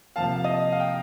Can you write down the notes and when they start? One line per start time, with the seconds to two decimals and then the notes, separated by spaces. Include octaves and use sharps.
0.16 C3 F3 A#3 F5 A5
0.36 F5
0.44 D#5
0.72 F5
0.80 G5